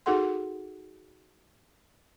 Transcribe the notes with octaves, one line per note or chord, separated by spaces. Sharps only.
D#4 F#4 G#4 A4 F#5 C6